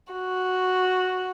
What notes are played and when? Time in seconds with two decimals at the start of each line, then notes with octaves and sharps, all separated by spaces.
0.13 F#4